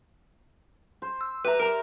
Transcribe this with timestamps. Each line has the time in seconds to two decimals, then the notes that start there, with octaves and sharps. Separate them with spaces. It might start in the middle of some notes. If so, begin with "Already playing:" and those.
1.02 C5
1.21 E6
1.45 G4 B4 E5 A#5
1.60 A#4 D5 A#5